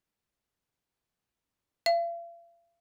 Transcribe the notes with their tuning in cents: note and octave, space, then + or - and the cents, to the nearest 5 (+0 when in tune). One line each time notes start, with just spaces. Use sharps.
F5 -45